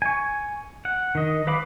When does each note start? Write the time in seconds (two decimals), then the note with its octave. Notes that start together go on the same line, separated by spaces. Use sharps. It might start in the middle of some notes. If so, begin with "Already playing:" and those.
0.02 G#5 C#6
0.85 F#5
1.15 D#3 D#5
1.47 B4 F5 B5 D6